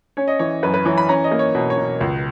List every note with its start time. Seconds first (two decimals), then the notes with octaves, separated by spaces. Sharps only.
0.17 C#4 C#5
0.28 D#5
0.39 E3 C#5
0.63 F#2 B4
0.74 B4
0.86 E3 C#5
0.98 B5
1.09 C#4 A#5
1.24 D#5
1.31 A#3
1.39 C#5
1.55 B2
1.70 C#5
1.78 B2
2.01 C#2